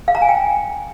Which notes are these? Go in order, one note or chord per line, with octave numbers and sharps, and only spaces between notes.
F5
A#5
G#5
G5